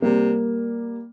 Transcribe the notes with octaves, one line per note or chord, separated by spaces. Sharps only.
C3 G3 A#3